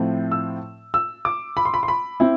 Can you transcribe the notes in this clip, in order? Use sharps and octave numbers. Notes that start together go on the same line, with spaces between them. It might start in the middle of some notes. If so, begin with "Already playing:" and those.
Already playing: A2 F3 C4 E4
E6
E6
D6
B5
C6
B5
C6
B5
C4 E4